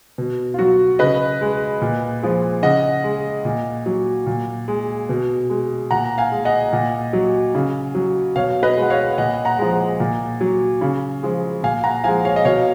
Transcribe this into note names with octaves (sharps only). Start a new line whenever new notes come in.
B2
F4
F#3 F#4
C#3 B4 D#5
G#3
A#2
F3 G#3
C#3 D#5 F#5
G#3
A#2
F#3
A#2
G#3
B2
G#3
A#2 F#5 A#5
F5 G#5
G#3
D#5 F#5
A#2
F#3
C#3
F#3
B2 C#5 F5
B4 D#5
G#3
F#5
C#5 F5
A#2 D#5 F#5
F#5 A#5
F3 G#3
A#2
F#3
C#3
F3 G#3
A#2 F5 G#5
F#5 A#5
F3 G#3 F5 G#5
C#5 F5
D#5
B2 C#5 F5